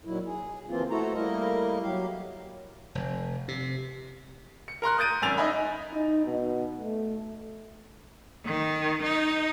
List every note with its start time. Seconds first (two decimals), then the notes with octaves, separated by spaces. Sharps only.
0.05 A#2 D#3 F#3 E4
0.25 G#4
0.69 D2 E3 F3 A#3 C4 F4
0.90 A3 E4 F#4 A4 C5 A#5
1.14 G3 A3 A#3 E4 A#4 D#5
1.82 F#3 G4 F5
2.95 F1
3.48 C3
4.68 C#7
4.82 A#4 A#5 C6 F#6
4.97 D#6 F#6 G6 A6 D7 D#7
5.22 G#1 F#2 G#5 E6 A6 F7
5.37 D#4 D#5 E5 G#5 B5
5.93 D#4
6.25 B2
6.78 A3
8.45 D#3
9.03 D#4